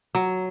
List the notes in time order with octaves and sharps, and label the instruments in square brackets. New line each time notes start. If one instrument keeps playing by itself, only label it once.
[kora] F#3